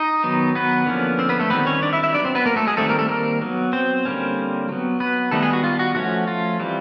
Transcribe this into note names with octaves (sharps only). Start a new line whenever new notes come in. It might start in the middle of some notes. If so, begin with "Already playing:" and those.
Already playing: D#4 D#5
D#3 F#3 B3
B3 B4
D3 F3 A#3 C#4
C4 C5
B3 B4
A3 A4
D#3 G3 B3 C4 B4
C#4 C#5
D4 D5
E4 E5
E4 E5
F#3 B3 D4 D5
C4 C5
B3 B4
A#3 A#4
A3 A4
G#3 G#4
D#3 G3 A3 C4 A4
A#3 A#4
A3 A4
A#3 A#4
F#3 B3
C4 C5
D3 G3 A#3 C#4
F#3 B3
B3 B4
D#3 G3 A3 B3 A4
G#3 G#4
F#4
F4
F#4
F3 A3 C#4 F#4
F4
E3 G3 C4